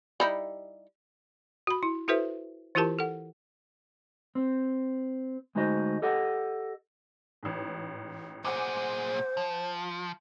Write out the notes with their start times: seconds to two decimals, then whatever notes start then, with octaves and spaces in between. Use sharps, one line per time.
0.20 G3 D#4 E4
1.67 F#4 B5
1.83 E4
2.08 E4 F#4 A4 B4 C5 E5
2.75 E3 E4 F4 G4 A#4 A5
2.99 A4 F#5
4.35 C4
5.55 D2 G#3 D#4 F#4 C5 D#5
6.02 G4 A4 D#5 F#5
7.43 A1 G#2
8.45 A#2 G#4 C5 F#5 G#5 D6
9.37 F3